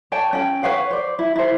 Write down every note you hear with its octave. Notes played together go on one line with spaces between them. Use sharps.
C#5 D5 G5 A5
C#4 G5
B4 C#5 F5 F#5
C5 D5
E4
E4 C5